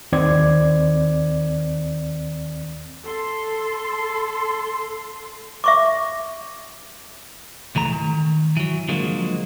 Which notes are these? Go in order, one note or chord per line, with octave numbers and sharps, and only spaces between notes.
D#2 D#3 C4 D5 G#6
A4 C6
E5 C#6 D6
C#2 E3 A3 A#5
D#3
E3 F#3
D3 F3 F#3 G#3 A#3